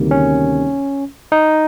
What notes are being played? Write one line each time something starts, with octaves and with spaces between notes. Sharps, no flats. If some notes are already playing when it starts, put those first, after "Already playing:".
Already playing: D2 C3 D#3 G3 A#3
C#4
D#4